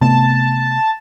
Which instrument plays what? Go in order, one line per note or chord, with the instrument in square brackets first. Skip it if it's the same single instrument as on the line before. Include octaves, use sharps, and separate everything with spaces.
[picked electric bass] C3 A3 B3 [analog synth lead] A5